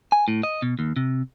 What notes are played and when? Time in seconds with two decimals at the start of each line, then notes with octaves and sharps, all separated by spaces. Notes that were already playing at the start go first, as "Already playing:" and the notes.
0.12 G#5
0.28 A2
0.43 D#5
0.62 B2
0.79 D#2
0.96 C3